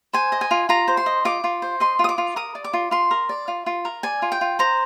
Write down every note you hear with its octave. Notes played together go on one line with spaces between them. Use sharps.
C5 G#5
D#5
G#5
F4
F4 A#5
C5
C6
D#5
F4 D6
F4
C5
D#5 C6
F4 D#6
D6
F4
A#4 D#6
D5
D6
F4
F4 C6
A#4
D5
F4
F4
A#4
D5 G#5
F4
G5
F4
C5 A#5